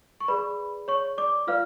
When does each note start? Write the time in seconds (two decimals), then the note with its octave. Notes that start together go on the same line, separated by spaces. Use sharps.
0.21 C#6
0.28 G#4 B4 D5 B5
0.88 C#5 C#6
1.18 D5 D6
1.47 F4 B4 D5 F5 F6